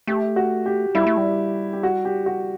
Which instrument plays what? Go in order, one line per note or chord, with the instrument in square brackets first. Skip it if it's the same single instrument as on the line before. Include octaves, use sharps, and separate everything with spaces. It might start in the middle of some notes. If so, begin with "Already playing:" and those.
[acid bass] A3 [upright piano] G4
[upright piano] F#4
G4
[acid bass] G3 [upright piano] E4
[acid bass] A3
G3
[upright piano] G4
F#4
G4
F#4